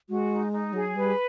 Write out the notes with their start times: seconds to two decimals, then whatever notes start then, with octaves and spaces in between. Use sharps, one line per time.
0.08 G#3 F#4
0.31 D#4
0.52 D#4
0.73 F#3 G#4
0.95 G3 B4